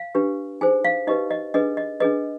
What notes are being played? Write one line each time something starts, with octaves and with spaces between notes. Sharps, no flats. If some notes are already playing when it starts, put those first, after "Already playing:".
Already playing: F5
D4 G4 B4
D#4 G#4 C5 G#5
F5
D#4 G4 B4 D#5
D#5
D4 G#4 B4 D#5
D#5
D4 G#4 B4 D#5